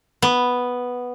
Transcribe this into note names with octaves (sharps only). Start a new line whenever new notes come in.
B3